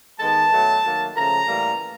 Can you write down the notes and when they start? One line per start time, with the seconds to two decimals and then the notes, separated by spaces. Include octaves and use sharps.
0.19 D#3 G#3 B3 A5
0.51 B2 F#3 A3
0.84 D#3 F#3 A#3
1.15 C#3 F3 A3 A#5
1.47 A2 E3 G3 A#3